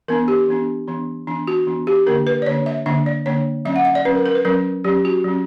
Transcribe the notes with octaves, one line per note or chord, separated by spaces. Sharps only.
E3 B3 D4 A#4
G4
E3 B3 D4
E3 B3 D4
E3 B3 D4
F#4
E3 B3 D4
G4
D3 A#3 D4 A#4
B4
D5
D3 A#3 D4 C#5
E5
D3 A#3 D4 E5
D5
D3 A#3 D4 C#5
F#3 C#4 E5
F#5
E5
D5
F#3 C#4 B4
A#4
A#4
B4
F#3 C#4 A#4
F#3 C#4 G4
F#4
F#3 C#4